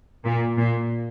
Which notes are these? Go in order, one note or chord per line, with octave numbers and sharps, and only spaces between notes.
A#2
A#2